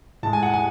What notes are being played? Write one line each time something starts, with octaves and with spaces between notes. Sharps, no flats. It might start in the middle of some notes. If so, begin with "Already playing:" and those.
A2 G#3 A5
G#5
F#5
G#5